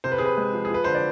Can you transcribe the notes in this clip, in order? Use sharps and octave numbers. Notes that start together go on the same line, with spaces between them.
C3 C5
B4
C3 G#4
B4
G#3
F3
G#4
F4 B4
D3 C5
D5